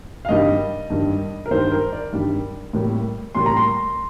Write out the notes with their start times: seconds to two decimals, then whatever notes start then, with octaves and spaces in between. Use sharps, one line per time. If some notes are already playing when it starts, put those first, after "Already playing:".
0.25 F5
0.29 G2 D#3 G3 D#5
0.90 G2 D#3 G3
1.46 A#4
1.51 G2 D#3 G3 C5
1.72 A#4
1.92 D5
2.12 G2 D#3 G3
2.73 A2 G3 A#3
3.35 A2 G3 A#3 C6
3.46 A#5
3.57 C6